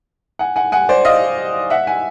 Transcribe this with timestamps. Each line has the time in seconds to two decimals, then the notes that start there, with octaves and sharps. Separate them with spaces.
0.39 F#5 G#5
0.56 F#5 G#5
0.72 F#5 G#5
0.89 C5 D5
1.05 D#5 F5
1.70 E5 F#5
1.87 F#5 G#5